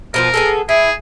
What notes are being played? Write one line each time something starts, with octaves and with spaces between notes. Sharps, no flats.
B2 F3 F4 A#4
B3 G#4 A4
E4 G#4